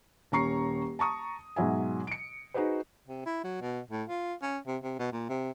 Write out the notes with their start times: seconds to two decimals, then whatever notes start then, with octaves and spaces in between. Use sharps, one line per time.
0.32 D#1 C#4 A#5 C#6 C7
0.99 A5 A#5 C#6 D#6
1.56 G#2 B2 F#3 E5 G#5
2.07 C#7 D7
2.54 D#4 F#4 G#4 B4 C5
3.08 C3
3.26 E4
3.44 F#3
3.61 B2
3.91 A2
4.09 F4
4.42 C#4
4.67 C3
4.83 C3
4.99 B2
5.12 A#2
5.29 C3